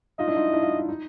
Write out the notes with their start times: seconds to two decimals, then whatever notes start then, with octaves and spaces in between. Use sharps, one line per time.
0.19 D#4 F4 D#5
0.27 D4 E4
0.36 D#4 F4
0.53 D4 E4
0.62 D#4 F4
0.79 E4
0.89 D#4